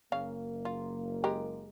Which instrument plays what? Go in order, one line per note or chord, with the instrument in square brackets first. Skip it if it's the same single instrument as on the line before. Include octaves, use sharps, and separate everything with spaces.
[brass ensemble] F#1 A#3 [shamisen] C#3 F5
[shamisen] F4
G#3 G4 A#4